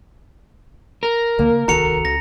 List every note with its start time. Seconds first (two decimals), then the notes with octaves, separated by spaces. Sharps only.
1.03 A#4
1.39 D2 D3 E3 A#3
1.51 C#3
1.68 D1 C2 D#3 F#4 A4 A#5 C#7 F7
2.05 C#2 A#6